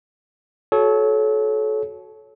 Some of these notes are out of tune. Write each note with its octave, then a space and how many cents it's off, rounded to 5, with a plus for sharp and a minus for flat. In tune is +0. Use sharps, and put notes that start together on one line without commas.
F#4 +0 A4 -30 C#5 +0